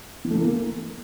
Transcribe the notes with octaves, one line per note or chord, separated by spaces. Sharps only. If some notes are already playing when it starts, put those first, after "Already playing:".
E3
A3
E3
A#3